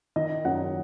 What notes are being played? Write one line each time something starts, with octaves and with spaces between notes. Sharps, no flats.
D#3 D#5
F#2 F#5